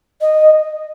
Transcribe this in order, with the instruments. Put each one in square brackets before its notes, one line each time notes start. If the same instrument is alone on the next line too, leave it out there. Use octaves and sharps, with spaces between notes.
[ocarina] D#5